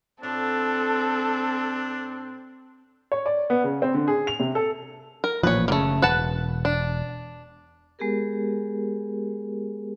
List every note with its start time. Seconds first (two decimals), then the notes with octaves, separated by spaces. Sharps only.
0.23 A2 C4 D4 F4 A4
3.12 C#5
3.26 D5
3.50 B3
3.64 C#3
3.82 C4
3.94 D3
4.08 G#4
4.27 F7
4.40 C3
4.55 A4
5.24 A#4
5.43 A1 A#2 F3 B4 C#5
5.68 F#1 A2 C#3 A3 A#3
6.02 E1 B4 F#5 A5
6.65 D4
7.99 G#3 B3 G4 G#4 A#4